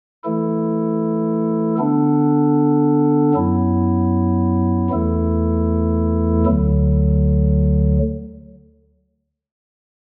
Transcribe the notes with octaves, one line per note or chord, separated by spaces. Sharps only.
E3 A3 E4 A4
D3 B3 D4 A4
F#2 F#3 B3 E4
E2 E3 A3 E4 A4
D2 D3 F#3